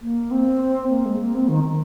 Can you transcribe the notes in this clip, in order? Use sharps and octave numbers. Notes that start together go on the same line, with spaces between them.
A#3
C4
A#3
G#3
A#3
C4
D#3
D#3